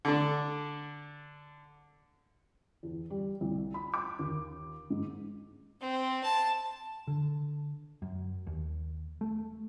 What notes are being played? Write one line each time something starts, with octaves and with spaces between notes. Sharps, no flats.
D3 D4
E2
G3
C2
B5
D6
D#2
G#2
C4
A5
D3
F#2
D#2
A3